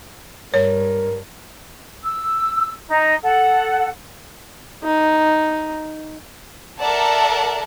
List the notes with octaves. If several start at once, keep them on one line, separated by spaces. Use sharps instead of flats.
G2 A#4 C#5
E6
D#4
A4 F#5
D#4
A4 A#4 D5 E5 F#5 A5